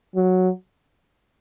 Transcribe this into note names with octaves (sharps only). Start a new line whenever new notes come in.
F#3